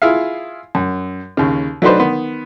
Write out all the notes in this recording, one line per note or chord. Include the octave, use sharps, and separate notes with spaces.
E4 F4 G#4 E5 F5
F#2
D#2 C#3
F#3 A3 D4 D#4 B4 C5
D#3 B3 C6